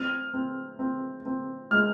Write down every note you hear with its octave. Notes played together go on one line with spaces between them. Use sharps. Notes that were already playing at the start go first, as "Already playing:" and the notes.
Already playing: C4 F6
C4
C4
C4
G#3 F6